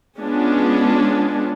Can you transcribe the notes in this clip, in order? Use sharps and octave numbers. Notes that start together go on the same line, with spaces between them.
G#3 B3 C#4 D4 F4